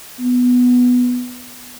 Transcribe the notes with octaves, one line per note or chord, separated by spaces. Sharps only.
B3